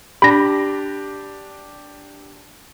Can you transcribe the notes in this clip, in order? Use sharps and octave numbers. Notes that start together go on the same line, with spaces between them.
D4 G4 B5 A#6